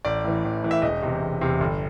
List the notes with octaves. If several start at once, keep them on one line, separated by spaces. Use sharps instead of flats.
A1 D5
A2 E3
A1
A2 E3
E5
E1 D#5
E2 C3
E1
E2 C3
G1